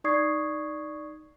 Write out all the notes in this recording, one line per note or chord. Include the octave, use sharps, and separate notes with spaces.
D#4 D5 C#6 D#6 G#6 C7